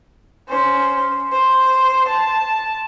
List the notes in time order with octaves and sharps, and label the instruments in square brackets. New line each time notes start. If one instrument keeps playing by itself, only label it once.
[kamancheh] C#4 C5
C5
A5